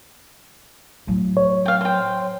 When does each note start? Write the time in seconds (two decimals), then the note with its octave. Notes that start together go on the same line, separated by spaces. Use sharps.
1.07 A2 F#3
1.37 C#5
1.65 F5 G5
1.81 C5 G5